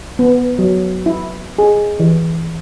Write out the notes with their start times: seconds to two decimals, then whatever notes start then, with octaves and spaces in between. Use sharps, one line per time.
0.19 B3
0.59 F#3
1.06 E4
1.59 G#4
2.00 E3